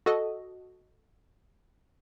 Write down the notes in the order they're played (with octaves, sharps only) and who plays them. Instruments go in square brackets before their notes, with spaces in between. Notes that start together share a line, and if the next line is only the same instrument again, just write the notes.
[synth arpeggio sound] F#4 A4 D#5